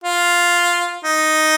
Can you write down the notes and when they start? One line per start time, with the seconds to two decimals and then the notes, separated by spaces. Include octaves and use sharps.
0.04 F4
1.04 D#4